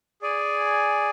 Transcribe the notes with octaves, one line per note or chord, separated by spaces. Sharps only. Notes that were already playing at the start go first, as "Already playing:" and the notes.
G#4 D5 G#5